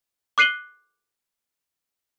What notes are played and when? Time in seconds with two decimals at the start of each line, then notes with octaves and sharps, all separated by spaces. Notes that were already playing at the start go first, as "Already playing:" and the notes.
0.38 D6 F#6 C7 D#7 F#7 G7